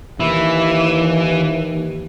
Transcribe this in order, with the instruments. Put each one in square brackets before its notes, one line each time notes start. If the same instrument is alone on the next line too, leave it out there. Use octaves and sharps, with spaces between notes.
[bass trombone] D#2 [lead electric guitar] E3